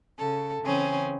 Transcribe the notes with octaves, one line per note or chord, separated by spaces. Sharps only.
C#3 A4
C#3 E3 C4 C#4 G#4